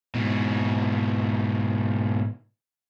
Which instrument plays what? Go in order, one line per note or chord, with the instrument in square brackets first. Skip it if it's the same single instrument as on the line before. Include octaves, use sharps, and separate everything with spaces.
[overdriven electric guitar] G#2 B2